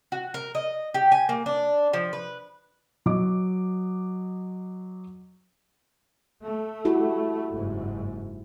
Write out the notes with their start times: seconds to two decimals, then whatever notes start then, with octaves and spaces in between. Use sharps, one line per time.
0.12 F#4
0.34 A#4
0.55 D#5
0.94 G4
1.12 G#5
1.29 A#3
1.46 D4
1.93 F3
2.13 B4
3.06 F#3 D#5 D6
6.43 A3
6.85 E4 F#4 G4
7.51 F#1 G#2